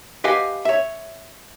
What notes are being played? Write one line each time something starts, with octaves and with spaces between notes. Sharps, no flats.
G4 B4 D#5 F5 F#5 G#5
C#5 E5